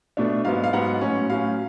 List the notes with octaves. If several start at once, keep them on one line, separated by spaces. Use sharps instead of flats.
B2 A3 D4
G#2 F#3 B3 F5
F5
G#2 F#3 B3 F#5
A2 F#3 C#4
A2 F#3 C#4 F5